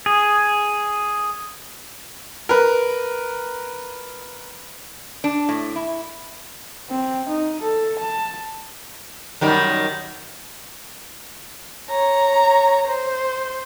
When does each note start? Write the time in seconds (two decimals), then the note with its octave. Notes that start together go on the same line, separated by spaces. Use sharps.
0.06 G#4
2.49 A#4 B4
5.24 D4
5.49 A2
5.76 E4
6.91 C4
7.29 D#4
7.62 A4
7.99 A5
9.41 F#2 D#3 G3
11.90 C#5 A#5
12.87 C5